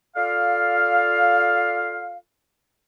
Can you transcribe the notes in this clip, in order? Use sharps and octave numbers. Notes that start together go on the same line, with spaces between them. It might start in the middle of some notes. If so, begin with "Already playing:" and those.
F4 A4 D5 F5